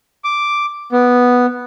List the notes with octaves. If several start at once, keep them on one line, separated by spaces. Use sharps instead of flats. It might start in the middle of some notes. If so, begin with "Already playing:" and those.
D6
B3